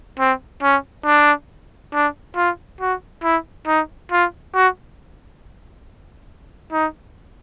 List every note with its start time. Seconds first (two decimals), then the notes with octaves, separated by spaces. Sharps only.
0.19 C4
0.63 C#4
1.06 D4
1.94 D4
2.36 F4
2.81 F#4
3.24 E4
3.67 D#4
4.12 F4
4.55 F#4
6.73 D#4